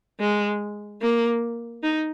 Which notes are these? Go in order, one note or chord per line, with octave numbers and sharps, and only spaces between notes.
G#3
A#3
D#4